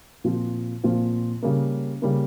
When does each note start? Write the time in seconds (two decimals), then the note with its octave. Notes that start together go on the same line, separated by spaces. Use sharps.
0.24 A#2 F3 C4 F4
0.84 A#2 F3 C4 F4
1.43 C#3 G3 A#3
2.02 C#3 G3 A#3